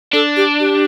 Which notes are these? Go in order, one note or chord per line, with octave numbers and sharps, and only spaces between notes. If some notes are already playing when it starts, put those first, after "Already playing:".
D4 A4
G4
G4